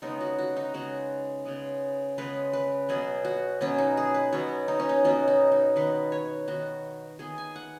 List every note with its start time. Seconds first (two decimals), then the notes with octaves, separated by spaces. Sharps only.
0.02 C#3 G#3 B3 D#4
0.20 F#4
0.38 F#4
0.56 D#4
0.74 C#3 G#3 B3 F#4
1.45 C#3 G#3 B3
2.18 C#3 G#3 B3 B4
2.53 B4
2.89 B2 F#3 B3 G#4
3.25 F#4
3.61 B2 F#3 B3 C#4
3.78 D#4
3.97 G#4
4.14 B4
4.33 B2 F#3 B3 C#5
4.68 D#4
4.79 C#4
4.89 D#4
5.04 B2 F#3 B3 C#4
5.28 D#4
5.52 D#4
5.76 D#3 B3 B4
6.12 C#5
6.48 D#3 B3 F#4
7.19 D#3 B3 G#4
7.38 G#5
7.56 F#5